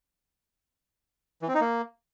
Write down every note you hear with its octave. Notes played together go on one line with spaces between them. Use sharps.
E3
C4
D#4
A#3